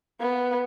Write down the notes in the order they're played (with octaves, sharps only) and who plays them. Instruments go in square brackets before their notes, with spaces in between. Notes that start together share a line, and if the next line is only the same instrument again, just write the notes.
[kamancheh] B3